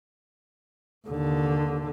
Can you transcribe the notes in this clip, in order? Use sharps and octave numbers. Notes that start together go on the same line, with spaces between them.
D#2 D3